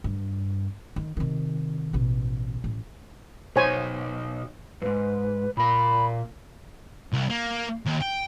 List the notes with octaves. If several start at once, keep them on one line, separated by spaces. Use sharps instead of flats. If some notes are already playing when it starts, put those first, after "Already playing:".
G2
D#3
C3 D#3
A1 B2
A1
B2 D#4 F#4 C5 C#5 G#5
F2 G#2 B4
A#2 A#4 B5
C2
A#3
D#2
G5